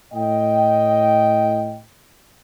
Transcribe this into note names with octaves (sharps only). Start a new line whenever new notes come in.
A2 D#5 G5